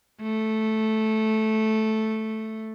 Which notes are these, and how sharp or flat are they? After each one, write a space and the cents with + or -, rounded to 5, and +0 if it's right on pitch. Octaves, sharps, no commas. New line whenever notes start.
A3 -5